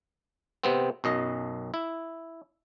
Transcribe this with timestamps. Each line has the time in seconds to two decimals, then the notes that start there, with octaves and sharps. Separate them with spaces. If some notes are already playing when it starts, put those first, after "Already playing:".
0.64 C3 B3 C4
1.04 B1 F#2 D#5
1.74 E4